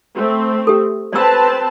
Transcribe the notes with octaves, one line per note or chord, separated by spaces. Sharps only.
A3 C4
G4 A4
C4 B4 D5 A5 E6